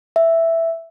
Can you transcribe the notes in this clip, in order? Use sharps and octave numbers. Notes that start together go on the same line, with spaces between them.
E5